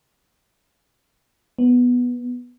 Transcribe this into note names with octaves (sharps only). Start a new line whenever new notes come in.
B3